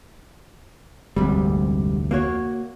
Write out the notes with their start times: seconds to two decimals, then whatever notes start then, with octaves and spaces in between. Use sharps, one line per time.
1.16 F1 D2 G#2 C3 G3
2.11 A#3 F#4 C#5